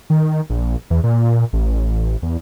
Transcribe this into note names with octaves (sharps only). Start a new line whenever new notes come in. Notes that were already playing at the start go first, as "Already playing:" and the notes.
D#3
A#1
E2
A#2
A1
E2